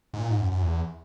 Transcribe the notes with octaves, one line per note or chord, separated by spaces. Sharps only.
G#2
A#2
G#2
F#2
F#2
E2